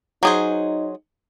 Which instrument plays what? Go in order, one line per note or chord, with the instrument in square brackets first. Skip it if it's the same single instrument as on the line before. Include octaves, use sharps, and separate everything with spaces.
[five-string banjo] F#3 G#4 C5 [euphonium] D#4